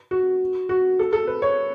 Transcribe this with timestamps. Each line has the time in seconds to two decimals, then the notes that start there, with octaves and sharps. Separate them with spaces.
0.11 F#4
0.69 F#4
0.99 A4
1.13 A4
1.27 B4
1.42 C#5